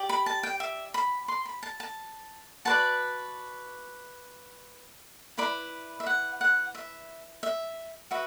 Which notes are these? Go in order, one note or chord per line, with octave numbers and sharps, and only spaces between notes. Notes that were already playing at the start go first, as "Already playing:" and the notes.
Already playing: G4 D5
B5
A5
G5
E5
B5
C6
B5
A5
A5
F#4 B4 D5 A5
E4 B4 D5 B5
E5
F#5
F#5
E5
E5
F#4 B4 E5